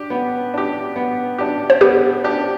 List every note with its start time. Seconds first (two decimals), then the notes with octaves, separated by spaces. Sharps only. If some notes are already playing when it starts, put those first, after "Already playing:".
Already playing: D4 G4
0.10 B3
0.54 D4 G4
0.96 B3
1.38 D4 G4
1.70 C5
1.81 B3 G4 B4
2.24 D4 G4